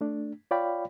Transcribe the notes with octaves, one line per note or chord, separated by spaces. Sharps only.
A3 D4
F4 C#5 D5 F5 G5 B5